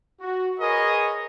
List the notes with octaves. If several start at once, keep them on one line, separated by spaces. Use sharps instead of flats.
F#4
G#4 A#4 B4 C#5 D#5